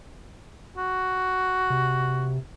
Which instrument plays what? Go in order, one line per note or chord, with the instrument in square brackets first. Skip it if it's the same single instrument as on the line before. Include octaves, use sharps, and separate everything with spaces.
[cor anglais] F#4
[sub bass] C3